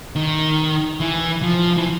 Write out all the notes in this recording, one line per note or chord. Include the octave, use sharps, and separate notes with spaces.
D#3
E3
F3
E3